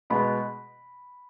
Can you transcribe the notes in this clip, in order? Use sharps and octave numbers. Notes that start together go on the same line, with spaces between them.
B2 G#3 B3 B5